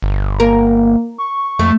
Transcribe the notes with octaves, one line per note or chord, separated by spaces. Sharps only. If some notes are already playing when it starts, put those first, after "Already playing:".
G1
A#3 A#4
C#6
F2 A3